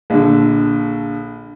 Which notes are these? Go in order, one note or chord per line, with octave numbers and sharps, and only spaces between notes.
A#1 D3